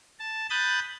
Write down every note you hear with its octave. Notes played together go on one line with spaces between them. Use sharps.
A5
B5 D#6 F#6 G6 A6